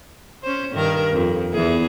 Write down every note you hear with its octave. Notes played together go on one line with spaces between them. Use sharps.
C#4 C5
G2 D#3 A#4
F2
E2 E3 G#4